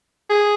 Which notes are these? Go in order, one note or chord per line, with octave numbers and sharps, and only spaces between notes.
G#4